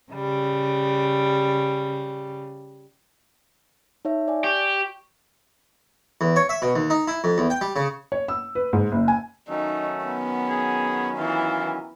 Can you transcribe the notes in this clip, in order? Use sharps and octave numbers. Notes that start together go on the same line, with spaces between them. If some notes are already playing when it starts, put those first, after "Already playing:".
C#3 G3
D#4 C#5 E5
D5 G#5
G4 C#6
E2
C#5
E5
B2
D#2
D#4
E4
F2
E2
G5
G3
C#3
C#5
E6
B4
G#2
F#1
G#5
D#3 F#3 A3 C#4 D#4
B3
G#4
E3 F4